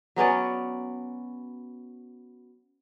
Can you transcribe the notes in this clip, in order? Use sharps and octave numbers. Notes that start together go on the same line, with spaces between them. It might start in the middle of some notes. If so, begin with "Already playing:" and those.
F#3 B3 C#4 D5